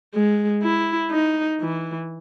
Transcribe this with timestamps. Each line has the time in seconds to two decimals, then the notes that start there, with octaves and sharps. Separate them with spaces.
0.15 G#3
0.63 E4
1.11 D#4
1.61 E3